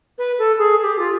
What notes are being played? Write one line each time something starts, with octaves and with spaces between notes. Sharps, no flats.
B4
A4
G#4
G#4
G4
F4